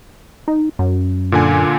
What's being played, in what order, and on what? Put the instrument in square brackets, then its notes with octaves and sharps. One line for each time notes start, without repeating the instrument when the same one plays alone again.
[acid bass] D#4
F#2
[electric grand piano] A#2 D3 G#5